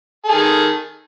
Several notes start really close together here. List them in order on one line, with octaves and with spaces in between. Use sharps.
A4 G#4 D#3